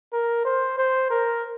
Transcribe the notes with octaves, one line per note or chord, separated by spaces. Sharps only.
A#4
C5
C5
A#4